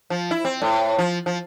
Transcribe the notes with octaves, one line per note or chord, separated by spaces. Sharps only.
F3
E4
C4
A2
F3
F3